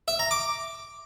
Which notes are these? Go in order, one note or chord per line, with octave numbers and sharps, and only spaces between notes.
E5
A#5
D6